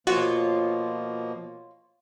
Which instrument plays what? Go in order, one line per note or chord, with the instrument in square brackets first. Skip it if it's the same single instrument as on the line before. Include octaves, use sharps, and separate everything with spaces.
[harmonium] B2 F3 A#3 [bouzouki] F4 C#5 [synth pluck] F#4